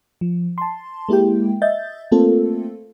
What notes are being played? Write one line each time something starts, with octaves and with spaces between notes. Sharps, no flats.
F3
A5 C6
G#3 A#3 E4 G4 G5
D#5 E5 G6 A6
A3 A#3 C4 F4 A4